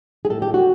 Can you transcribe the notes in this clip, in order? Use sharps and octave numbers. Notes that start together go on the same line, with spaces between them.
G#4
A2 A4
G4
G3
F#4